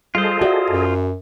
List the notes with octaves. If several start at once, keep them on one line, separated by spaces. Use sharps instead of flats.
G3 F4 G#4 A4 C5 D#5
F#4 D5 E5
F#2